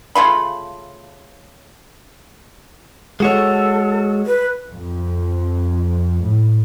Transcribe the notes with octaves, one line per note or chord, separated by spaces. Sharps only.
C#3 A3 F4 B5
G#3 F#4 A4 C#5
B4
F2
A2